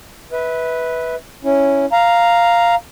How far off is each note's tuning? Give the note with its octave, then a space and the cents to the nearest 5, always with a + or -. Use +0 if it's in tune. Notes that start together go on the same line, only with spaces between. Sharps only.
B4 +0 E5 -30
C#4 +0 E4 +0
F5 +0 A#5 +0